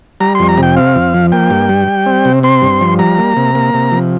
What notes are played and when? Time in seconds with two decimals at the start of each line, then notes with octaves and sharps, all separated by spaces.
0.20 G3 A#5
0.35 F2 C6
0.49 A#5
0.58 C3
0.63 G5
0.76 C4 F5
0.95 F2
1.14 F3
1.32 A#3 G5
1.50 G2
1.69 G3
1.88 G3
2.06 C4
2.25 C3
2.43 C4 C6
2.62 G2
2.81 F3
2.99 G3 A#5
3.19 A#3
3.37 C3
3.55 A#3
3.74 C3
3.92 F3